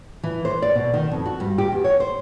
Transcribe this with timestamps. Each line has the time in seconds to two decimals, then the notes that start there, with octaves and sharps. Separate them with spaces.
0.23 E3
0.45 C5
0.62 D5
0.75 B2
0.94 D#3
1.12 F2
1.26 F#4
1.40 G2
1.58 G4
1.72 E2
1.84 C#5
2.00 C5